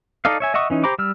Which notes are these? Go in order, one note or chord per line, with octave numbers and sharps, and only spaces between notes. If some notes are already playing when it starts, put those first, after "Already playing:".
D#4 A4 D5 D#5 F5
C#5 E5 G#5
D#5 E5 F#5 C#6 D#6
E3 C#4 D#4
G4 C5 A#5 B5 D6
G3 E6 F6